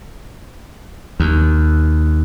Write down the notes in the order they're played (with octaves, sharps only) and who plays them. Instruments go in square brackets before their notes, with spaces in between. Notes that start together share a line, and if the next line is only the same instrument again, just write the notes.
[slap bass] D#2